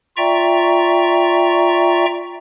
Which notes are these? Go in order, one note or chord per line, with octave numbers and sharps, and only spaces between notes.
F4 D5 E5 G5 A#5 C#6